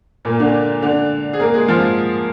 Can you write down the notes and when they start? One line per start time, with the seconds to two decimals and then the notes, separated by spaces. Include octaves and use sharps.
0.25 A#2 A#3
0.40 D3 D4
0.82 D3 D4
1.33 G#4
1.40 A#3 A#4
1.54 G#3 G#4
1.68 F3 F4